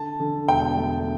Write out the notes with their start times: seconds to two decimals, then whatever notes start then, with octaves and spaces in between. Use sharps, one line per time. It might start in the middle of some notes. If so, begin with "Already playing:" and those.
Already playing: D3 A5
0.20 D3
0.48 E1 G5
0.77 A3